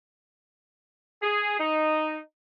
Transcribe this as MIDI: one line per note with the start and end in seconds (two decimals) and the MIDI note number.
1.22 1.56 68
1.59 2.18 63